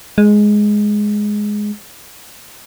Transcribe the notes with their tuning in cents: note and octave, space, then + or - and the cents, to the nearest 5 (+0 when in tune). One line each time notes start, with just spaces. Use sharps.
G#3 +5